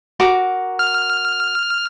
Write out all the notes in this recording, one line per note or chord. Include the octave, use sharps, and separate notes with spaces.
F#4 A#4 D6
F6